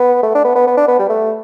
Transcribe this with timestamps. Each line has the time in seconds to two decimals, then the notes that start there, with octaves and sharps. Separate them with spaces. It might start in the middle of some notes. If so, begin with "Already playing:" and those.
Already playing: B3
0.23 A3
0.35 D4
0.45 B3
0.55 B3
0.67 B3
0.77 D4
0.88 B3
0.99 G3
1.09 A3